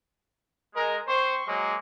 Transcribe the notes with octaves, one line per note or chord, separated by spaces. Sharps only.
G#3 A#4
C4 C5 C6 C#6
F#3 G#3 A#3